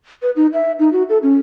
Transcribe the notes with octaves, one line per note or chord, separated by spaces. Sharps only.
B4
D#4
E5
D#4
F#4
A4
C#4